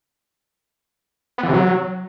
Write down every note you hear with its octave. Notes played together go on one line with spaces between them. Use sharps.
B3
E3
C3
F#3